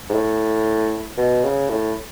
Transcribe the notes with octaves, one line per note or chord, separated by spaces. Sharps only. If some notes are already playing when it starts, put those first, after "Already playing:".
G#2
A2
B2
C#3
A2